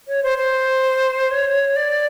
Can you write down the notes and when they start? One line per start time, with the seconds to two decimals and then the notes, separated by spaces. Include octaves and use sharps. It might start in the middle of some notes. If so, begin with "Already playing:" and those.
0.08 C#5
0.23 C5
0.38 C5
1.31 C#5
1.76 D5